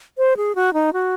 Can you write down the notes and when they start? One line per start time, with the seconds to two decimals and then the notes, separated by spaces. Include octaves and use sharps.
0.18 C5
0.37 G#4
0.55 F#4
0.74 D#4
0.93 F#4